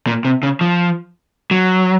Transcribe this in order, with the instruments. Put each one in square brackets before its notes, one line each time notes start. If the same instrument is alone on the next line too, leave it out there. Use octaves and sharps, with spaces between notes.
[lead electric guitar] A#2
C3
C#3
F3
F#3